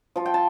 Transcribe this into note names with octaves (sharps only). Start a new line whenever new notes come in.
F3 A5
G5
A5